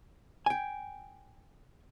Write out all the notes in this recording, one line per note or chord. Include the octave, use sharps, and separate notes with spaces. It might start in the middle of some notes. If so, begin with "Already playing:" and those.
G5 G#5